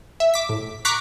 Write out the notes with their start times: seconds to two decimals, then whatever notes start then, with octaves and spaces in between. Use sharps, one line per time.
0.20 E5
0.34 D6 B6
0.49 A2
0.85 A#5 C#6 D6 F#6 B6 C7